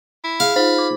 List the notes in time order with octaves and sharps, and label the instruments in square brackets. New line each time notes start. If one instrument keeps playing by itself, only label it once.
[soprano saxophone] E4
[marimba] G#4 [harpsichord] F5
[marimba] D#4 F4 [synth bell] C5 [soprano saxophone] B5
[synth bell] D6